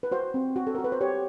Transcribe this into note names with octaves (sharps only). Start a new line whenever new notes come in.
B4
F#4 C5
C4
F#4
A4
A#4
F#4
B4
C5
G4 C#5